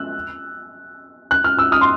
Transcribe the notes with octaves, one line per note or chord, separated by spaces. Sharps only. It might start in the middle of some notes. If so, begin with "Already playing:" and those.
Already playing: E6 F#6
F#6
F6
E6
D#6 F6
C6